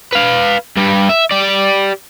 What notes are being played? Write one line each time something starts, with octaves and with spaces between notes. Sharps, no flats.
B4 F5
G2 G3
E5
G4 D5